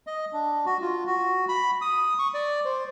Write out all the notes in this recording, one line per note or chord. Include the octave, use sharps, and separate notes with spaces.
D#5
D4
F#4
F4
F#4
B5
D#6
C#6
D5
C5